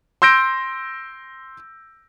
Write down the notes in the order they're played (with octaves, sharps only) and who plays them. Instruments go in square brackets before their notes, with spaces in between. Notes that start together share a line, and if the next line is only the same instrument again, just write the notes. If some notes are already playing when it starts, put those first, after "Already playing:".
[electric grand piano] C6 E6 G6 A#6 D7